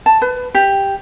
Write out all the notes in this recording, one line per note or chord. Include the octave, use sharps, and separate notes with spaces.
A5
B4
G4